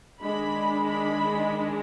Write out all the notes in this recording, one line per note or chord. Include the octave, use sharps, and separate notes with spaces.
D#3 G#3 D4 B5
B5